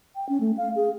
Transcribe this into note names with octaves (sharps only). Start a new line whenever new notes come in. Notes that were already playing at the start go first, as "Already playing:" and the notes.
G5
C#4
A3
F5
G#4